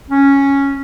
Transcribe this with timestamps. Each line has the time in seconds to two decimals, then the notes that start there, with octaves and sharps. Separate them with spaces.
0.10 C#4